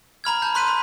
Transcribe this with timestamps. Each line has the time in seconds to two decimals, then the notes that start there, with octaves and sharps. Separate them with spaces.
0.24 A#5 B5 F6 G#6
0.42 A5 G6
0.55 B5 C6 F#6 B6 D#7
0.68 B5